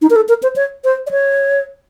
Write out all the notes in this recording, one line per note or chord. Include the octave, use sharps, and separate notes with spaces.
D#4
A#4
A4
A#4
C5
C#5
C5
D5
C#5